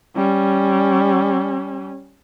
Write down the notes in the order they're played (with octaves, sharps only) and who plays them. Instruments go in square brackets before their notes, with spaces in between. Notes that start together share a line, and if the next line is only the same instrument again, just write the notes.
[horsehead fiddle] G3 C#4